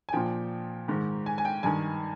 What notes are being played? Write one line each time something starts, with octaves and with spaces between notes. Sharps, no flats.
G#5
A#2 F3 G5
G#2 D#3
G#5
G#5
G5
G2 D#3 G#5